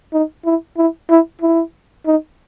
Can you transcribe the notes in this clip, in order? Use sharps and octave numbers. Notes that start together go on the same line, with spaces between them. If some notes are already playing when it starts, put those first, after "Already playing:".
D#4
E4
E4
E4
E4
D#4